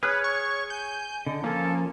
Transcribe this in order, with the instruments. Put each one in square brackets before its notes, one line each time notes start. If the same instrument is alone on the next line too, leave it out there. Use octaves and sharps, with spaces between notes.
[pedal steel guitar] G#4 F6 F#6 [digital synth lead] B4 [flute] C#5
[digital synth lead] C#6
[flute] G#5 [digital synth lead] G6
[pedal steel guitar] D3 [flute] D#5
[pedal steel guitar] F3 C#4 G#5 [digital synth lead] A#3 [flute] A4